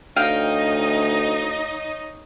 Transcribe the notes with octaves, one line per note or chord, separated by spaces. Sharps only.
D2 D#4 C#5 D#5 F5 G5